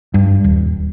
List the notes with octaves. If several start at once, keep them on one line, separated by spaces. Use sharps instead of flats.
G2
D#1